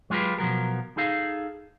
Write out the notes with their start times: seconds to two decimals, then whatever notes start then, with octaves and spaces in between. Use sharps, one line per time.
0.10 F#3 G#3 F4 G4 B4
0.39 B2 F3 F#3 A#4
0.97 D#4 G#4 A4 F5